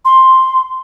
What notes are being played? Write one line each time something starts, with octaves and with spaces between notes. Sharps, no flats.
C6